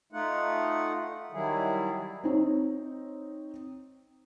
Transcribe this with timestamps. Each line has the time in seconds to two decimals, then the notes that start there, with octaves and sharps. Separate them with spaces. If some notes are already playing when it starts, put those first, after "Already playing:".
0.13 A3 D#4 F4 F#5
1.32 D#3 F#3 G3 E4 G#4
2.23 C4 D#4 C#5